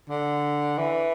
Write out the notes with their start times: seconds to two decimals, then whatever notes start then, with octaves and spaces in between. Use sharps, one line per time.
0.09 D3
0.78 E3